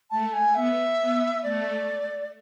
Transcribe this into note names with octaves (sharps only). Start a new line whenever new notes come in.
A3 A5
G#5
B3 E5
B3
A3 D5